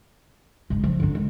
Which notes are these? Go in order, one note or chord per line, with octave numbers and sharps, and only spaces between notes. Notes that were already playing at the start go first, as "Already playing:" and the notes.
C#3 G#3
F3
D3 D4
G#3